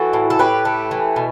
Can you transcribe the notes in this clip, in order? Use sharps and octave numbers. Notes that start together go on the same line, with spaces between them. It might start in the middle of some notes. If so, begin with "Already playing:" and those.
Already playing: E3 F#4 A4
A2
A4
A2 G4 B4
A3
E3
B2